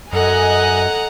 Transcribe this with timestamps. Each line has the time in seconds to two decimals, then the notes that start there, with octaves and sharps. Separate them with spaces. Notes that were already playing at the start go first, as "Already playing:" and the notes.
0.13 F#2 A4 D#5 F#5 G#5 A#5 F#6